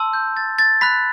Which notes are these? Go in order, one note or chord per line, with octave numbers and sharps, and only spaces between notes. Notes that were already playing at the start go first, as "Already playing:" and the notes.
Already playing: A5 C6 E6
G6
A6
A6
B5 F#6 B6